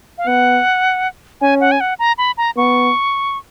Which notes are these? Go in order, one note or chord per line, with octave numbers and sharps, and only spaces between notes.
F5
B3 F#5
C#4 G#5
F#5
G#5
F#5
A#5
B5
A#5
B3 C#6